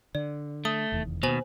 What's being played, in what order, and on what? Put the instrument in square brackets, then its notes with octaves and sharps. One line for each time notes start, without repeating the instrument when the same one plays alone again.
[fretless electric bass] D3 [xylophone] D5
[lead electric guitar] A3 [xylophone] D#6
[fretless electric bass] F1 E2 D#3
[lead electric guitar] D#2 B2 [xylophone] C5 G#5 F#7